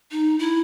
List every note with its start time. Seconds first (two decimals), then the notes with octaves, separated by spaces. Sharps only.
0.12 D#4
0.39 E4